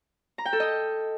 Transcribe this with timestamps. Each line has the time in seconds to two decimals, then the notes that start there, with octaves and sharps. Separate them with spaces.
0.38 A#5
0.45 G5
0.53 A4
0.60 D#5